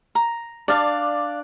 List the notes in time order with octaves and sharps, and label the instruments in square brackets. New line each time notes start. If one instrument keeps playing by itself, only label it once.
[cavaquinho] A#5
[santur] D4 [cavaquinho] D5 F5